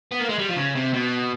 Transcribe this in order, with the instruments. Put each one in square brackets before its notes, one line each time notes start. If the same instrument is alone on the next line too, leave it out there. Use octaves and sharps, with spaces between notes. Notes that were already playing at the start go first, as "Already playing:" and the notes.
[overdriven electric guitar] B3
A#3
G#3
G3
F3
C#3
C3
B2